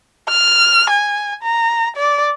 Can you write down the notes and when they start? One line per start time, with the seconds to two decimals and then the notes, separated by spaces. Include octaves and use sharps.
0.29 F6
0.90 G#5
1.43 A#5
1.97 D5